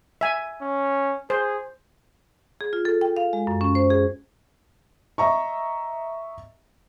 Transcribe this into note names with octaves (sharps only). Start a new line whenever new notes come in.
E5 G#5
C#4
G#4 C5
G#4
F4
A4
G5
F5
G#3
F#2
C#4
C5
G#4
D#5 E5 A#5 C#6